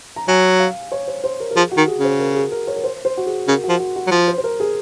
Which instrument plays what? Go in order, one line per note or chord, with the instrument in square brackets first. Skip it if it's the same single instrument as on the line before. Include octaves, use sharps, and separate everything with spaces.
[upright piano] A#5
[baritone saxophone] F#3 [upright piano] G#5
[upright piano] F5
C#5
C5
C5
A#4
A#4
[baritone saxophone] F3 [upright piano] G#4
[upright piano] F#4
[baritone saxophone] D#3
[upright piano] G#4
[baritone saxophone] C#3
[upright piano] C5
A#4
G#4
A#4
C#5
A#4
C5
C5
F#4
G#4
[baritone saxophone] C#3 [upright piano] A#4
[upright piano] F#4
[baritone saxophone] F3
[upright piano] F#4
F#4
[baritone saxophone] F#3
F3
[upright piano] C5
C5
A#4
G#4